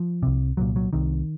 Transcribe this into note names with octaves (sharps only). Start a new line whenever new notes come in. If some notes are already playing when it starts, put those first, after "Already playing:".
Already playing: F3
C2 C3
C2 A#2 F#3
F#3
C2 C3 D#3